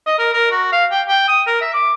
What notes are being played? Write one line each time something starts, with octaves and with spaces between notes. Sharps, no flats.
D#5
A#4
A#4
F#4
F5
G5
G5
D#6
A#4
E5
D6